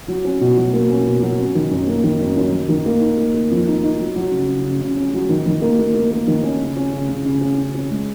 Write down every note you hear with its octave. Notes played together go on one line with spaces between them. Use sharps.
F#3
C#4
B2
F#3
A#3
C#4
B2
F#3
C#4
D#3
F#2
A#3
D#3
F#2
F#2
F#2
D#3
A#3
D#4
A#3
A#3
F2
D#4
D#4
F#3
F#3
C#3
C#3
C#3
C#3
C#4
F#3
D#3
D#3
A#3
A#3
A#3
A#3
D#3
C#4
C#3
C#4
C#3
C#3
C#3
C#4
C#3
C#4
G#3